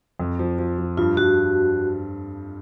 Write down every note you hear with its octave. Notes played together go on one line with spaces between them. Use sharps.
F2
F3
F3
F3
G2 F4
G2 F#4